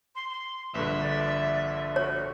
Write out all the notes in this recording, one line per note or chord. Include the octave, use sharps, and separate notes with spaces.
C6
C6
A#1 G2 D3 B4 E5
D5
F#4 C#5